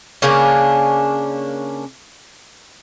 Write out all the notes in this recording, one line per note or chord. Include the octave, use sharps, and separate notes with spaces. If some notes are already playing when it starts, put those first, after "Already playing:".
C#3 A#3 C#4 D4